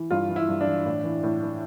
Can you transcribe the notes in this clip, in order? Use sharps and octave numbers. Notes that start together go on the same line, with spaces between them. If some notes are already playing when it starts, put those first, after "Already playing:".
Already playing: E3
G2 F4
E3
E4
G2
D4
E3
A2
E3
A2
E3